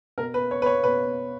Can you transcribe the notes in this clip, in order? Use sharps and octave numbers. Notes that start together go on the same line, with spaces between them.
B2 A#4
B4
C#5
B4
C#5
B2 B4